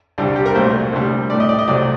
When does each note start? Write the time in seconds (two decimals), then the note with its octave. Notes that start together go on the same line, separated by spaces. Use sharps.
0.18 C2 C3 G3 D4
0.36 G4
0.46 A#4
0.55 C2 A#2 F#3 A3 C5
0.93 D2 C3 G3
1.30 A2 A3 D5
1.40 D#5
1.49 D5
1.59 D#5
1.68 C2 C3 F#3 A3 D5